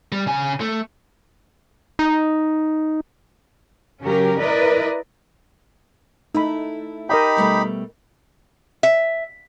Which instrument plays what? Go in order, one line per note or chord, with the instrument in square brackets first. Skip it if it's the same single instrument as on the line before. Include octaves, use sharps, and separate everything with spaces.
[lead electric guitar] G3
C#3 G#5
A3
[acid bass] D#4
[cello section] C#3 F#3 C#4 G4 A#4
E4 A#4 B4 D5 D#5
[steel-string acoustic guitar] A3 E4 [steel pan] D#4 B5
[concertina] D#4 G4 B5 [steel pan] A#4 D#5 G5
[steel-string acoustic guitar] B2 G3 A3
[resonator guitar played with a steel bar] E5